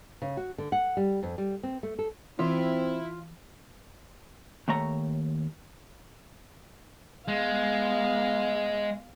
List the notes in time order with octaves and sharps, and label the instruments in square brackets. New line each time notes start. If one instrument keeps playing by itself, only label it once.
[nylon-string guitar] C#3
F#4
D3
F#5
G3
F2
G3
C4
A3
A4
[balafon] E3 [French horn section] C4 [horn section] E4 [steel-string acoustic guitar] F4
[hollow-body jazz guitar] D#2 A3 C#5 A#5
[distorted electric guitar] G#3 [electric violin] B3 F5